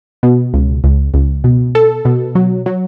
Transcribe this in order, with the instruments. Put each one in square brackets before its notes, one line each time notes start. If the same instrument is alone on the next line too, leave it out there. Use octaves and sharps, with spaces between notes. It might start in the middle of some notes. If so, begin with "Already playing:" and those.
[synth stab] B2
C#2
C#2
C#2
B2
A4
B2
F#3
F#3